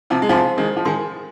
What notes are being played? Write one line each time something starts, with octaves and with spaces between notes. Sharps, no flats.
C3 F3
G#3
C3 F3 D#4 C5 F5 G#5 C6
D#3 G#3
F3
D#3 G#3 A#4 G#5 C6